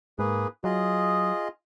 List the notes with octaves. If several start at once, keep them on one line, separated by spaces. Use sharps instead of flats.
G#2 A#3 G#4 B4
F#3 F4 G#4 D#5